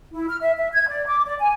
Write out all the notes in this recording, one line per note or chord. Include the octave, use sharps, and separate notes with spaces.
E4
F6
E5
E5
G#6
D5
D6
D5
G#5